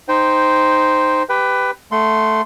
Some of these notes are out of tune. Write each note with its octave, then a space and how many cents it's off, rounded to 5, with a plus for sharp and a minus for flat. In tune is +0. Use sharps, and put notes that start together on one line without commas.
D#4 +0 C5 -5 G5 +0
G4 +0 B4 +15 G5 +0
A3 +0 F#5 +0 C6 -5